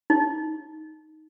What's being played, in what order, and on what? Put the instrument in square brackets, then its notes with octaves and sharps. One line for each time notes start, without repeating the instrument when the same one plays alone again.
[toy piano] D#4